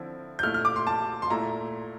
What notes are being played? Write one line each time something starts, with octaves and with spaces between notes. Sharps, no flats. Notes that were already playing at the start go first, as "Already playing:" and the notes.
Already playing: D3 F3 C4 E4
G6
A#2 A3 E4 F6
F6
D6
C6
A5
C6
A#2 A3 E4 A#5